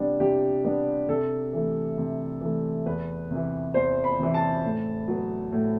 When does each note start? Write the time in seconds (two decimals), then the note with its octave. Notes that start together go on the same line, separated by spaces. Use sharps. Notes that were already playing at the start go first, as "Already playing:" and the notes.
Already playing: C3 G3 B3 D4
0.20 C3 G4
0.64 G3 B3 D4
1.09 C3 A4
1.53 E3 A3
1.98 C3
2.41 E3 A3
2.85 E2 B4
3.31 C3 E3
3.74 E2 C5
4.04 B5
4.19 C3 E3
4.34 A5
4.64 A2
5.08 F#3 B3
5.52 A2